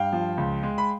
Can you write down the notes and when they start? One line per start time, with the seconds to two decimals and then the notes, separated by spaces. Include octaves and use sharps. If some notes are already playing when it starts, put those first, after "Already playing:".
Already playing: G2 F5 G5
0.13 F3
0.38 C#2
0.63 G#3
0.78 B5